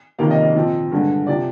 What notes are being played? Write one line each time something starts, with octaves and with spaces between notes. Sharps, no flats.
F2 C3 D#3 A#3 F5
D#5
D#5
A#2 F3 C4
G2 D3 G#3
C3 F3 D5